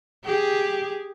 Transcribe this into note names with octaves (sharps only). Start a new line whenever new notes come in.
G4 G#4